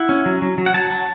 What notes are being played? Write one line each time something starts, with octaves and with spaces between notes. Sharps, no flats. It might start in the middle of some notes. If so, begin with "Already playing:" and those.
Already playing: E4 F#5
C#4
F#3
F#3
F#3
F#5
F#3 A5
F#3